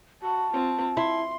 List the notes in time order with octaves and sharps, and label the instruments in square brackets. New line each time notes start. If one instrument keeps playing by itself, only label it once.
[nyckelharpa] F#4 [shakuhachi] A5
[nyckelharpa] C4 F4
[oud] E4 [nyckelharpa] C6